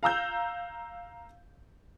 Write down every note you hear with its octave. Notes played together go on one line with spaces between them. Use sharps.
F5 A#5 E6 G6